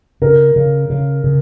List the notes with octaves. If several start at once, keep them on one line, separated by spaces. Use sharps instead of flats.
C#3 A#4
C#3
C#3
C#3